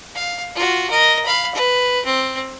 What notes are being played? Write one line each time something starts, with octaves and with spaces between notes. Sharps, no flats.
F5
F4 F#4
A#4 D#5
F5 B5
B4
C4